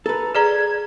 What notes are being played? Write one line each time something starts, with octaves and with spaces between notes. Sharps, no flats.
A4 B4 A#5
G#4 D5 A#5 G#6